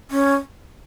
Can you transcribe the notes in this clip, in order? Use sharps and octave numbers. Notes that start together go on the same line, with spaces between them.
C#4